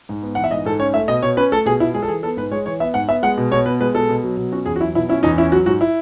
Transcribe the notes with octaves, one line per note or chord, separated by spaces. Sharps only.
G#2
B3
E3 F#5
E5
G#2 D#5
G#2 A4
C#4 C#5
A3 E5
B2 D#5
B2 C#5
C#4 B4
A3 A4
B2 G#4
B2 E4
G#3 G#4
A4
E3 G#4
B3 A4
G#2 B4
G#3 C#5
E3 C#5
B3 E5
G#2 F#5
B3 E5
G#3 F#5
B2
B2 C#5
B3 B4
G#3 B4
B2 A4
B2
F#3
B2
C#4 F#4
E2 G#4
F#4
F#3 E4
B2 E4
C#4 E4
E2 D#4
C#4 E4
F#3 F#4
G#2 F#4
E4